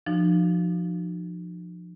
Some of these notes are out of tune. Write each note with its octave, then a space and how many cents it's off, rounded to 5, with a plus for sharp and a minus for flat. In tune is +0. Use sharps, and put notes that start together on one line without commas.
F3 +0 D#4 -45 F#4 +0